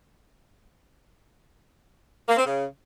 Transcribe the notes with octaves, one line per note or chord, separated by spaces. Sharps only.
A#3
C4
C#3